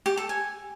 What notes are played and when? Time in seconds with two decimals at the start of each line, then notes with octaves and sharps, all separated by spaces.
0.06 G4
0.17 A4
0.29 G#5